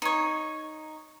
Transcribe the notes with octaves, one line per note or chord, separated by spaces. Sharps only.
D#4 C#5